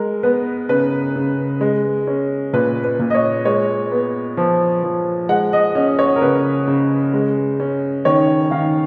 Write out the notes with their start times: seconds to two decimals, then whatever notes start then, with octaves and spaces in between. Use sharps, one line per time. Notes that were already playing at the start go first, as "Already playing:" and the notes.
Already playing: G#3 A#4
0.23 B3 B4
0.69 C#3 B4
1.16 C#3
1.61 G#3
2.07 C#4
2.53 A#2 B4
2.84 B4
2.99 A#2
3.10 D#5
3.15 C#5
3.45 G#3 C#5
3.91 B3
4.37 F3
4.83 F3
5.29 G#3 F#5
5.53 D#5
5.75 C#4 D#5
5.99 C#5
6.16 A#4
6.21 C#3 B4
6.67 C#3
7.14 G#3
7.60 C#4
8.05 D#3 C#5
8.51 D#3 F5